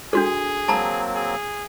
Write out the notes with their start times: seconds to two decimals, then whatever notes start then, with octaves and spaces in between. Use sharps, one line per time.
0.13 D4 F#4 G#4 A4
0.68 F#3 A#3 C4 A5 A#5
1.15 G#4